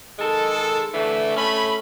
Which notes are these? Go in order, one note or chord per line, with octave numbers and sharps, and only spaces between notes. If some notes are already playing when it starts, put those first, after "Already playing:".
D#3 G#3 A4
D3 E3 A3
A3 C#4 B5